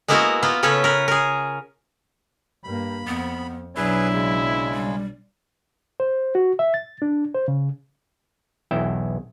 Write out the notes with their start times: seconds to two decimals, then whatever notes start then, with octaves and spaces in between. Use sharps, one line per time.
0.08 G#3 A#3 B3 E4 F#4 A#4
0.42 A#3 B3 F4
0.63 C#3 B3 C#4 A4 B4 C#5
0.84 A#4 B4
1.08 G#4 A#4
2.64 G2 A#3 B5
3.07 F2 B3
3.77 B1 F#3 D4 E4 G#4 B4
4.13 C#3 G#3
4.74 G3
6.00 C5
6.35 F#4
6.59 E5
6.74 A6
7.02 D4
7.34 C5
7.48 C#3
8.71 B1 E2 E4 E5 G5